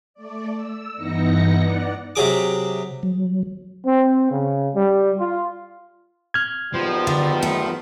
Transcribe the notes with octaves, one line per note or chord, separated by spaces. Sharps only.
A3 D5
E6
G2 E3 B3 D#4 A#6 C#7
D5 F#5
C3 F#3 G#4 D6
F#3
C4
C#3
G3
F4
F6 G#6
G#1 F3 G3 B3
D3
A3